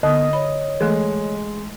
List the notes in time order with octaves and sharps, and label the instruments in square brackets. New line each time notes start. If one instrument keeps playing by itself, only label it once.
[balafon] D3 [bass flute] B3 [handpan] D#5
[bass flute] C#5 [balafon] B5
[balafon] E3 A3 A4 [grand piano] G#3